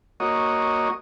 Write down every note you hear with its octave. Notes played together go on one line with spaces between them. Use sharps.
A#3 F#4 C#5 D#5